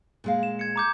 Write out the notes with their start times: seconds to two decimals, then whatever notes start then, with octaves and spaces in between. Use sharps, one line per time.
0.24 A#2 G#3 F5
0.43 E7
0.59 G#6 C#7
0.76 A#5 D6 G6